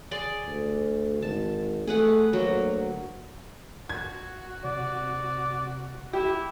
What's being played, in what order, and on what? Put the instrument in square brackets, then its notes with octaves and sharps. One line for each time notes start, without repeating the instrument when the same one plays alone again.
[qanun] G#4 D5 C6
[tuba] D2
[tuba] G#1 [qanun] A5
[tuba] A3 [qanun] G#4 B4 F#5
[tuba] D2 [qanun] F#3 A#3
[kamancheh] F#4 [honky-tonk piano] G#6
[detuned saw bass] C3 [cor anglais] D5
[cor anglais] E4 [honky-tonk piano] G4